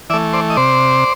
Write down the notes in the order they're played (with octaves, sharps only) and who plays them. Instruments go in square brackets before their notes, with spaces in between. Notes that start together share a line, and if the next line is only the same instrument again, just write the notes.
[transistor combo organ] E3 D5 E5
A3
C5 D5
D#5
C3 C5 D5